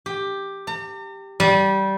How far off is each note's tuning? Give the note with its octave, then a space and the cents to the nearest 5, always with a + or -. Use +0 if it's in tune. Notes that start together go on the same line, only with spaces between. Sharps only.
G4 +5
A#5 -45
G3 -15